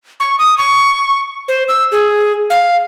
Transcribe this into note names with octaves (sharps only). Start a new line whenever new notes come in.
C#6
D#6
C#6
C5
E6
G#4
F5